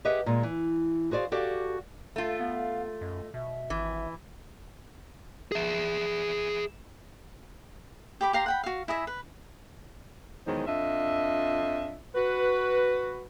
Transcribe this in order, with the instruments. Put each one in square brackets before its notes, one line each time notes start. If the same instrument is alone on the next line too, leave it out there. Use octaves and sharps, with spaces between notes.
[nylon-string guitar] G4 G#4 B4 D#5 E5 F#5
A#2 G#3
E3
F#4 G#4 C5 D5 F5
F#4 G4 A4 D5 F5 F#5
[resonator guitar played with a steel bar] A3 F4
[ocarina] F5
[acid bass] B3 [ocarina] F5
[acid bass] F#2 [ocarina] D#5
[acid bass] B2 [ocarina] E5
[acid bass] G#1 [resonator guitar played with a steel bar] E3
[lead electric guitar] G#4 E5
[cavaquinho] G4 B5 D6
G4 F5 A#5 C6
F#5 G5 B5
F#4 F5
E4 G#4 D#5 E5
B4
[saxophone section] E2 D#3 F#3 G#3 D#4 C5
F2 D4 F4 D#5 E5
F#4 B4